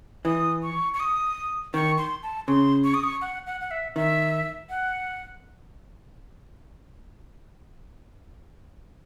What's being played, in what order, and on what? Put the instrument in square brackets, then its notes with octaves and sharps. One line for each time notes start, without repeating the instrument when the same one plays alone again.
[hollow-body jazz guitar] E3 [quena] D#6
[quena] C#6
C#6
D#6
[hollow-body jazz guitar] D#3 [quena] C#6
[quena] C6
A5
[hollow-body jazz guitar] C#3 [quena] C6
[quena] C#6
D#6
C#6
F#5
F#5
F#5
E5
[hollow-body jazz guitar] D#3 [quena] E5
[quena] F#5